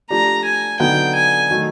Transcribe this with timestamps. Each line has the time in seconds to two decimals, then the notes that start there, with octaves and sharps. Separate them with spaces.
0.10 F3 A3 D4 G4 A#5
0.44 G#5
0.79 D3 F#3 B3 D#4 G5
1.15 G#5
1.51 D#3 F#3 A3